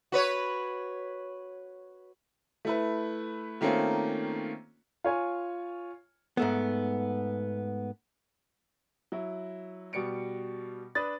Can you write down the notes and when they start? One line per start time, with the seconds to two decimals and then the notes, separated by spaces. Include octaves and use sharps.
0.12 F#4 B4 C#5
2.65 A3 E4 B4
3.61 D#3 A3 A#3 C4 C#4 F4
5.04 F4 C#5 G#5
6.37 G#2 A3 B3
9.12 F#3 E4
9.93 B2 G3 C#7 D7
10.95 D4 B4 D#6 A6